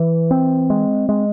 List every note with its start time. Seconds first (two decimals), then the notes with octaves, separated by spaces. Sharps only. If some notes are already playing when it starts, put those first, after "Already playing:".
Already playing: E3
0.31 C4
0.70 G#3
1.09 G#3